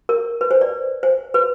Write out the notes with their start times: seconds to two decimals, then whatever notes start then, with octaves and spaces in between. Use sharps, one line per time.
0.09 A#4
0.41 B4
0.51 C5
0.61 D5
1.03 C5
1.34 B4